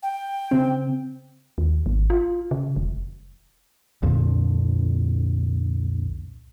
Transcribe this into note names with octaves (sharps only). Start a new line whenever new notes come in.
G5
C#3 C4
D#2
G#1
F4
C#3
F1
C2 F2 A#2 D3